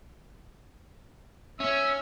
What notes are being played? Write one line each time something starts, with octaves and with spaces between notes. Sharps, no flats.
C#4 E5